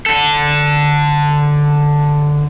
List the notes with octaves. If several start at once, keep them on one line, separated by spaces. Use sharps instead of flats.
D3 A4